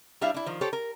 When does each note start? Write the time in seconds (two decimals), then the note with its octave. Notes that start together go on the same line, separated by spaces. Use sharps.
0.21 G3 D4 E4 E5 F5
0.34 D4 E4
0.46 D#3 F3
0.61 G4 A4 C5 C#5
0.73 A#4